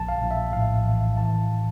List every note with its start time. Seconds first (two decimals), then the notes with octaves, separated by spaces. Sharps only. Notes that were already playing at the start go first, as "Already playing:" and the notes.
Already playing: A#1 A5
0.09 F5
0.20 A#1
0.31 E5
0.53 A2 F5
0.85 E3
1.17 E3 A5